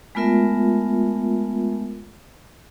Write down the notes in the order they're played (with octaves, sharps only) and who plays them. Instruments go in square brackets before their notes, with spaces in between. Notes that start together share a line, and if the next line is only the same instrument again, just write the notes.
[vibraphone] G#3 A3 B3 F4 A#4 E5